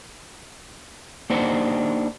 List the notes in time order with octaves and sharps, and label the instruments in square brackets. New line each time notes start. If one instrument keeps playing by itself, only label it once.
[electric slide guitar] A#3 D4 D#4 G4 C5 F#5